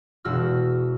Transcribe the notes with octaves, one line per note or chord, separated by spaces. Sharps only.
E1 F#4 E6 F6